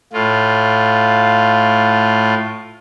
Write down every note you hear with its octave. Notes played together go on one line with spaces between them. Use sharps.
A2 F4